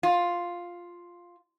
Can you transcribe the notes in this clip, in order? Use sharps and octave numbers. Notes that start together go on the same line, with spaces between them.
F4